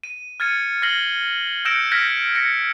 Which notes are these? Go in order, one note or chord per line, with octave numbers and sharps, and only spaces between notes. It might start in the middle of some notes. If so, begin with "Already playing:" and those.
D#7
F6 G#6 A6 C#7 D#7
F6 A6 A#6 C7 F#7 G7
E6 G6 A#6 C#7 D7 E7
F6 G6 G#6 A#6 B6 D7
A#6 C#7